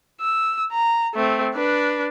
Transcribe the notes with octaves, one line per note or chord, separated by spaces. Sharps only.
E6
A#5
A3 C4
D4 B4